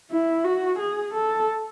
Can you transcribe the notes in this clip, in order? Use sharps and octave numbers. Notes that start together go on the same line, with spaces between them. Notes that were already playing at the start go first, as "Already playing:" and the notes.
E4
F#4
G#4
A4